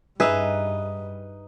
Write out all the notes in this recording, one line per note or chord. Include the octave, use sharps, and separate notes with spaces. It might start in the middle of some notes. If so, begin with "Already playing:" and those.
G2 G3 D#4 G#4 B4 E5